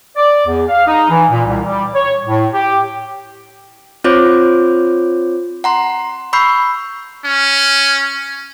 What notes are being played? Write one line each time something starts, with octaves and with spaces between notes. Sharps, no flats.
D5
E2
F5
D#4
E3
A#2
C2
G3
C#5
A2
G4
C4 F4 C5 C#5 D6 G6
F#5 A#5 C6
B5 C#6 E6 G6 C7
C#4